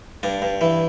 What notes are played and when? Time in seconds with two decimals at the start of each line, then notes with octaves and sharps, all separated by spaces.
0.23 G2 D4
0.42 G2
0.61 E3